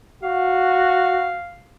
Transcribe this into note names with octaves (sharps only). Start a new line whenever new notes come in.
F#4 F5